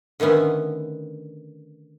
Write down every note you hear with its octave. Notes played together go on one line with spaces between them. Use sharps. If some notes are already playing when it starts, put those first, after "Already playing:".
D3 D#3 A3 B3 C#4